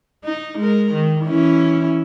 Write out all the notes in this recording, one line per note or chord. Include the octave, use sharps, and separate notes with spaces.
D#4
G#3 A#4
D#3
E3 C#4 E4